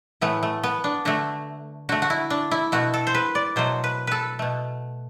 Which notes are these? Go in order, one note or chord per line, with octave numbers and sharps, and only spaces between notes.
A2 E3 A3 B3
A3
B3
D4
D3 A3 F#4
D3 A3 F#4
F#4
E4
D4
E4
B2 A3 F#4
A4
C5
B4
D5
B2 F#3 A3 C5
B4
A4 B4
B2 A3